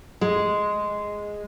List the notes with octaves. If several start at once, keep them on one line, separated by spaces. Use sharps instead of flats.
G#3